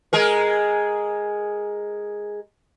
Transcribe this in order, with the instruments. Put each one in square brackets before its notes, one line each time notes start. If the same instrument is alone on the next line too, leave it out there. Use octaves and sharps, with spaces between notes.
[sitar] G#3 G#4 A#4